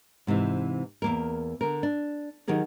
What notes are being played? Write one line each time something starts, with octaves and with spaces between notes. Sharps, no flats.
G#2 C3 D#3 E3
E2 A#3 A#4
D3 A#4
D4
D#3 F#3 G4 G#4 A#4